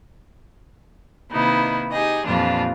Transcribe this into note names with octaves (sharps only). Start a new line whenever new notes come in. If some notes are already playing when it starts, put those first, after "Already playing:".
C3 D#3 A#3 D#4 E4 B4
D#4 G4 G#4 D#5
F2 A#2 E3 G3 D4 F4